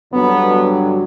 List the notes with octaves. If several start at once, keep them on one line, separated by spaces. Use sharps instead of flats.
G2 D3 F#3 B3